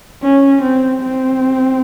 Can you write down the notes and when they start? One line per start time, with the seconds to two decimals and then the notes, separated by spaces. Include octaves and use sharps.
0.22 C#4
0.62 C4
1.03 C4